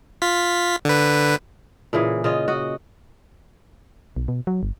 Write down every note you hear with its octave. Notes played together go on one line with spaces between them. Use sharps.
F4 B6
D3 B4
A#2 C#3 E3 G#4
C#3 F4 D#5
F#4 D#5
B1
B2
F#3
G1